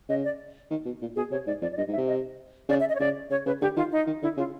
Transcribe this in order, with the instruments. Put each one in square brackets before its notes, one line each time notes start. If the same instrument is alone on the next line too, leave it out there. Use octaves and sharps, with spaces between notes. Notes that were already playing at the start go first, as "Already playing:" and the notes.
[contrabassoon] C#3 [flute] D#5
[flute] D5
[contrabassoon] D#3
B2
A#2
[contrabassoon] B2 [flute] G#4
[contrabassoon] C3 [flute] C#5
[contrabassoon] G#2 [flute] D5
[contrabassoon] F2 [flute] D5
[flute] D5
[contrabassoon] G2 [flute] D#5
[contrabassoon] G#2
[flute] E5
[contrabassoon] C3
[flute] D#5
[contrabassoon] C#3 [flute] D5
[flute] E5
D#5
C#5
[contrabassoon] C#3 [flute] D5
[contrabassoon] C#3 [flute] C#5
[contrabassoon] C#3 [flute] B4
[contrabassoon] D3 [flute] G4
[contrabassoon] D#3 [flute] F4
[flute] D#4
[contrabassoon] D#3
[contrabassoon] D3 [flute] E4
[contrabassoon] C#3 [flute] F4